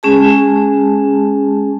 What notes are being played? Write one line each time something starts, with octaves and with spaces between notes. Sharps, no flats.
G#3 C#4 G#4 A5